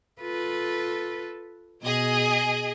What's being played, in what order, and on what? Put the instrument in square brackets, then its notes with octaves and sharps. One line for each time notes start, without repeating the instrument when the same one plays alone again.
[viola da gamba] F4 A4 B4
[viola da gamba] B2 [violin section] G#4 D#5 G#5